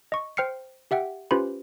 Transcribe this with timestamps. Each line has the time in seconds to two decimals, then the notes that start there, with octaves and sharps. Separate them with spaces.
0.12 D#5 C#6
0.37 C5 G5 F6 C7 C#7
0.91 G4 E5 F#5 G5
1.31 C#4 F4 G4 B4 C5 B5